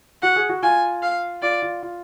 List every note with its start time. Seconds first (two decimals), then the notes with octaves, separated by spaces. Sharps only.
0.22 F#4 F#5
0.36 G#4
0.49 F#4
0.63 F4 G#5
1.02 F5
1.42 F4 D5
1.62 F4
1.83 F4